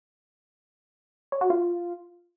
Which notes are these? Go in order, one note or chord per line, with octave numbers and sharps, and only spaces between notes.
C#5
F#4
F4